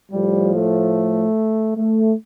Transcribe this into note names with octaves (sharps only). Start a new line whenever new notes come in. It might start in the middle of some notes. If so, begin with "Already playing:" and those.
A2 F3 G3
A3
A3